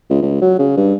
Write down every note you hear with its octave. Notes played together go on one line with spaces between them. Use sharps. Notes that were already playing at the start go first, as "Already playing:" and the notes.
C#2
C#2
F#3
C#3
G2